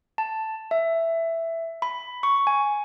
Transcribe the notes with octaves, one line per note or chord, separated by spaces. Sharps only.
A5
E5
B5
C#6
G#5